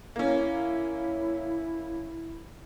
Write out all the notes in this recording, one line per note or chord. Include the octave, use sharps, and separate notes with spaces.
A#3 C#4 E4